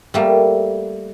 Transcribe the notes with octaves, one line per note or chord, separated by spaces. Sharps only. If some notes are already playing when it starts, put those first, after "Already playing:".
G3 A3 A#3